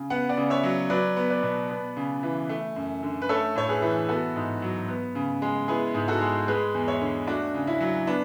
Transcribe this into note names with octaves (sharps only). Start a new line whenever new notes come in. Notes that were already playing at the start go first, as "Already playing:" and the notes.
Already playing: C#3
B3 F#5
D5 F#5
C#3
C#5 E5
F#3
F#3 B4 D5
B3
B4 D5
B2
B3
C#3
E3
A3
F#2
D3
B4
A3 A4 C#5
A2 C#5
G#4 B4
E3
B3 F#4 A4
G#2
F#3
B3
C#3
G#3
B3 E4 G#4
G#2
F#4 A4
G#3
G#3 G#4 B4
E2
C#5 E5
D3
A3 D4 F#4
C#3
C#4 E4
F#3
B3 D4